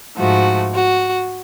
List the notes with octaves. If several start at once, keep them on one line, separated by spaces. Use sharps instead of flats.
G#2 F3 A3 F#4
F#4